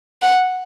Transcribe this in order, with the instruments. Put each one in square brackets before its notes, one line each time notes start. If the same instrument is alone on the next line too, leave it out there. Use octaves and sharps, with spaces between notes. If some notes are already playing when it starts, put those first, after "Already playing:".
[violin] F#5